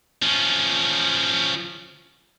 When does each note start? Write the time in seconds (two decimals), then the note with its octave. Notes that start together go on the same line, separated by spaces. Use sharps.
0.22 F3 C#4